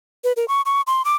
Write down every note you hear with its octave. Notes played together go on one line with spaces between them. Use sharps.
B4
A#4
C#6
C#6
C6
D6